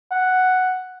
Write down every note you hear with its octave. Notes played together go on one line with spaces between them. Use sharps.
F#5